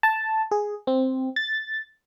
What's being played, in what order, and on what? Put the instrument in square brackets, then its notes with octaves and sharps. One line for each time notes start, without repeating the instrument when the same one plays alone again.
[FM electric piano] A5
G#4
C4
A6